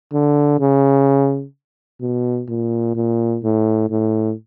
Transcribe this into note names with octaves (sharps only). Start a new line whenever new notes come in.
D3
C#3
B2
A#2
A#2
A2
A2